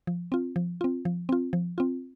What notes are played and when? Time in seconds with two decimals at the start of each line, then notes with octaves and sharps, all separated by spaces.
0.07 F3
0.32 C4 F4
0.56 F3
0.81 C4 F4
1.05 F3
1.29 C4 F4
1.53 F3
1.78 C4 F4